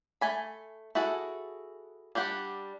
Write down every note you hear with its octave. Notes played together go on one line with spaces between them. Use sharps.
A3 G#5 B5
E4 F#4 G#4 A4
G3 D4 G4 F#5